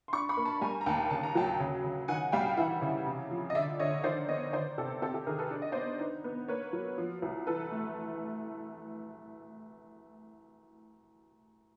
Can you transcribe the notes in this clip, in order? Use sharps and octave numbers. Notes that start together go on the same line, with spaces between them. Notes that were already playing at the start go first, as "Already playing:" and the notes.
C6
D4 B5 C#6
B5 C#6
A#3
A5 B5
G3 G#5 A#5
A#5
D#2 G5 A5
C#3 A5
A#5
F#3 G5 A5
C#3
C#3
D#3 F#5 G#5
G3 F5 G5
E3 E5 F#5
C#3
C3
F3
D#5
D3 D5 E5
D3 C#5 D#5
D#3 C5 D5
B3 C#5 D#5
D#3 C5 D5
C3 G4 A4
C4 G4 A4
G4 A4
D#3 G#4 A#4
A4 B4
D4 D5
D#5
B3 C5 D5
D#4
B3
A#3 B4 C#5
F#3
F3
C2
E3 A4 B4
A3